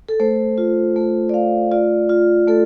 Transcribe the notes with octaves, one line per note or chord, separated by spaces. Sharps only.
A4
A3 C5
F4
A3
D5
A3 F5
F4 D5
F4
A3 A4